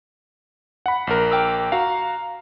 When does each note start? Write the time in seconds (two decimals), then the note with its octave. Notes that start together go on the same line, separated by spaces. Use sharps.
0.86 F#5 B5
1.07 A#1 A#4
1.31 G5 D6 E6
1.72 F#4 F5 A#5